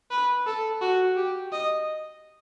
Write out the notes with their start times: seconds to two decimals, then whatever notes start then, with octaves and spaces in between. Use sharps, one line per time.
0.11 B4
0.47 A4
0.82 F#4
1.16 G4
1.52 D#5